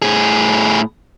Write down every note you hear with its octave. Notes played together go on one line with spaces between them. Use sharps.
A2 G#4